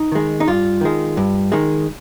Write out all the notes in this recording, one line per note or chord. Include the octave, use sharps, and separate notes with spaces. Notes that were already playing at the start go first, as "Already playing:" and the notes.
Already playing: D#4
D#3 G#3
D#4
G2 F4
D#3 G#3
G2
D#3 G#3